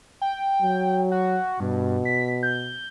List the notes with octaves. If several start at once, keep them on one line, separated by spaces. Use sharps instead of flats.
G5
F#3
F#4
G2 B2
B6
G6